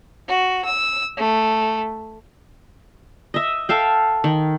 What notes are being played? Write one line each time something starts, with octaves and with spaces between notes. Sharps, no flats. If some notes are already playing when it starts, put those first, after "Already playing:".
F#4
E6
A3
D#5 E5
A4 E5 F5 G5
D#3